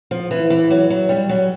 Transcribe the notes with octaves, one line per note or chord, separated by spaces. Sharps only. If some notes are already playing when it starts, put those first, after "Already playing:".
F3
E3
E3
F#3
F#3
G3
F#3